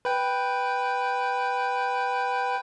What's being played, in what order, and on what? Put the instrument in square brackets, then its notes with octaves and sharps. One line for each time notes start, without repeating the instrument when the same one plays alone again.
[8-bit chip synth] B4 G5